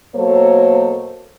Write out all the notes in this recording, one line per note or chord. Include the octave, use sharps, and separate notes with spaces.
B2 F#3 A#3 A4 C5 C#5